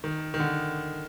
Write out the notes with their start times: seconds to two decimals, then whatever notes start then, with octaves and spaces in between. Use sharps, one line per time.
0.04 D#3
0.34 D#3
0.40 D3